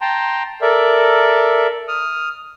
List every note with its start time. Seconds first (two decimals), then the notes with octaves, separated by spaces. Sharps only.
0.01 G5 A5 A#5 C6
0.61 A4 A#4 D5 E5
1.88 D#6 F6